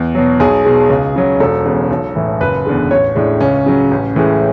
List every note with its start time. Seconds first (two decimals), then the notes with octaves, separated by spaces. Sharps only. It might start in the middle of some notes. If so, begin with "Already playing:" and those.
Already playing: E2
0.15 B2 F#3
0.40 B1 G#4
0.65 B2 G#3
0.90 C#2
1.16 C#3 F#3
1.40 E1 A4
1.65 E2 C#3 G#3
1.91 B1
2.15 A2 E3
2.40 F#1 B4
2.65 E2 D3 G#3
2.91 A1 C#5
3.15 A2 G#3 D4
3.40 C#2 C#4
3.66 C#3 F#3
3.91 A1
4.16 A2 E3 G#3